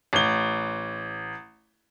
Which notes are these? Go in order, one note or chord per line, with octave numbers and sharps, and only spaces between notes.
A1 G7